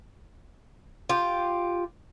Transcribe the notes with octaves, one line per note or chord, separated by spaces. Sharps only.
F4 G4